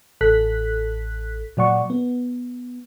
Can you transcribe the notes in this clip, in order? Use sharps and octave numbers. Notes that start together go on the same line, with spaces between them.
A1 A4 F#6 B6
A#2 F#3 D5 F#5 C#6
B3